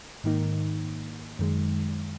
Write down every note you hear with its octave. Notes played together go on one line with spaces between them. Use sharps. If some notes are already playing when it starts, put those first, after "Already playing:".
G#2 D#3 A#3 D#4
F#2 D#3 G#3